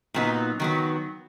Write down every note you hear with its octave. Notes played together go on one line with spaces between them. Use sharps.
A#2 F#3 B3 D#4
D#3 F#3 B3